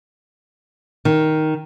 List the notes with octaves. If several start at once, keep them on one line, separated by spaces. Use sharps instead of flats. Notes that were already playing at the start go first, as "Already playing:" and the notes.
D#3